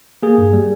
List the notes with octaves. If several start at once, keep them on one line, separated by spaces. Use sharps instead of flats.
A#3 G#4
G2
G3